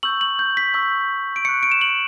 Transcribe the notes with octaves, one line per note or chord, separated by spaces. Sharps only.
C#6 E6 G6 F#7
F#7
G6
B6
C#6 E6 G6
D7
C#6 F#6 C#7
D7
E7
F#7